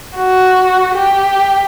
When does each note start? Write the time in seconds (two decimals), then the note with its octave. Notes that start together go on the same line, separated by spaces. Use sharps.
0.16 F#4
0.95 G4